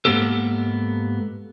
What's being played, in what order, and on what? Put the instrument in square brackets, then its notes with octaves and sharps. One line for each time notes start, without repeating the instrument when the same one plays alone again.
[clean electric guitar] G#2 G#3 A#3 B3 G4 A4